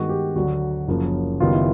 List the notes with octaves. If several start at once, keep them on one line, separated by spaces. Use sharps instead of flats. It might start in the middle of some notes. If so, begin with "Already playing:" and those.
Already playing: G2 D#3 G#3 B3 F#4
G4
D2 D3 F#3 F#4
F#1 F#2 C#3 F3 A#3
F#1 F#2 D#3 G3 B3 F4
E4